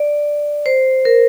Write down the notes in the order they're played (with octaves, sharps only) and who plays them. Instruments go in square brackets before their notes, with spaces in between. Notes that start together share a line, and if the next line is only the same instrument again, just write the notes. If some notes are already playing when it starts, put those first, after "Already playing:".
Already playing: [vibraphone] D5
C5
A#4